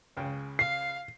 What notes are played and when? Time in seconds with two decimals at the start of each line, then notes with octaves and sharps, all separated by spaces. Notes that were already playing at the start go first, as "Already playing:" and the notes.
0.17 C#2 C#3 G5
0.59 F5 C7